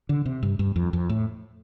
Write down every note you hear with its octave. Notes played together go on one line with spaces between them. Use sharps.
D3
C3
G2
G2
F2
F2
A2